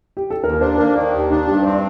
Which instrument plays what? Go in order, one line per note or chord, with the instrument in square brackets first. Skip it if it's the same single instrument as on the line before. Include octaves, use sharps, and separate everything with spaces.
[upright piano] G4
A4
[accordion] D#2 [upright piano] A#4
[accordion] D4 [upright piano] C5
[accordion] A#3 [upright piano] A#4
[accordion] D#3 [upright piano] D5
[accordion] D#2 [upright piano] G4
[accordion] D4 [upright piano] D#4
[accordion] G2 [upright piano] G4
[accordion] C4 [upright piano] C5
[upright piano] D5